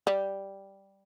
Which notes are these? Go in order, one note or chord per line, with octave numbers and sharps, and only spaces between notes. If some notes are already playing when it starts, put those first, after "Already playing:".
G3